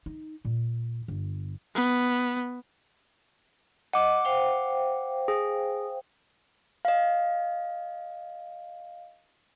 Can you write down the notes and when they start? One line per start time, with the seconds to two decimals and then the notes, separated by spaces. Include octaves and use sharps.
0.06 D#4
0.45 A#2
1.08 G1
1.75 B3
3.93 D#5 F#5 D6
4.25 C5 F5 G5
5.28 G#4
6.85 D#5 F5